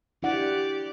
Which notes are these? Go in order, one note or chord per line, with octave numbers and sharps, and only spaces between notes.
D4 E4 G4 D5 F#5